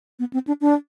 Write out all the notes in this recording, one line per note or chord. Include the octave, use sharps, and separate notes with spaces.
B3
C4
D4
D4